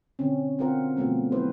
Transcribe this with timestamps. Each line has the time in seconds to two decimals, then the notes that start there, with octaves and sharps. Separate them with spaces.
0.19 B2 D3 C4 C#4
0.59 C4 C#4 F4 A#4 C5 F#5
0.97 B2 F3 A3 B3 C4
1.32 F#3 E4 B4 C5